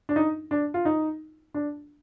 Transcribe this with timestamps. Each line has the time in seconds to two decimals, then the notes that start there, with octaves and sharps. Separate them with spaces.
0.09 D4
0.16 D#4
0.51 D4
0.74 F4
0.85 D#4
1.54 D4